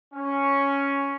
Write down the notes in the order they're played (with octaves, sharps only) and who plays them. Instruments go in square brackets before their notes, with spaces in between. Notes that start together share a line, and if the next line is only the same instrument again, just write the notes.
[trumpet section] C#4